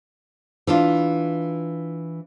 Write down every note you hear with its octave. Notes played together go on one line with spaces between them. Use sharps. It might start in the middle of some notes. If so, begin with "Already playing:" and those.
E3 D4 F4